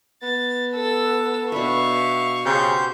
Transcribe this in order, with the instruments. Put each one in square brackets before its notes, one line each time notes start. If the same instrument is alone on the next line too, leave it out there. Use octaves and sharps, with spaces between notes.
[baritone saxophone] B3 [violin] A6
[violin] A4 E6
[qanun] B2 D4 B4 [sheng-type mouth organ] E5 [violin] F5 C#6
[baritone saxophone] C#3 [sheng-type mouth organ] G4 C5 G6